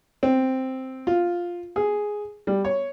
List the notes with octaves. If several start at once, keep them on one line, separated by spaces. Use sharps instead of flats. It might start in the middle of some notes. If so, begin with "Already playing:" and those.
C4
F4
G#4
G3
C#5